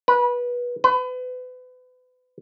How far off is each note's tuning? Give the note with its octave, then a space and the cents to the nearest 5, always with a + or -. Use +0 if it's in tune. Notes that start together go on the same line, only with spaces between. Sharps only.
B4 -20
B4 +35